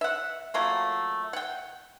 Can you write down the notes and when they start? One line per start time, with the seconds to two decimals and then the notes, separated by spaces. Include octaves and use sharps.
0.01 E5 F#5
0.54 F#3 A3 A#3 F4
1.33 F#5 G5